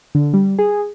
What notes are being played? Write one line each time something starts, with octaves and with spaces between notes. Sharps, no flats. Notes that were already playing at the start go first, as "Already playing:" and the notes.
D3
G3
G#4